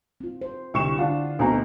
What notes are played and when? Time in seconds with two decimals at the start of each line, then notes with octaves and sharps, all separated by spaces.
0.21 C4 F4
0.41 C5
0.74 C2 D3 E4 C#6 E7
0.98 D3 D4 F4 F#5
1.39 D2 B2 A3 C4 D#5 A#5